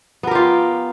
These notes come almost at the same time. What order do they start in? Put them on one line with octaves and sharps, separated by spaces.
B3 A#4 G4 F4